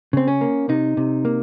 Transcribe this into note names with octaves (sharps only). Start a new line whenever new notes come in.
C#3 C4
C#4
A#3
C3 D#4
C3
A#3